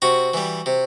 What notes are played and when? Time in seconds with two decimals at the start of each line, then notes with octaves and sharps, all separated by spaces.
0.02 C3 F#4
0.34 E3 G3
0.66 C3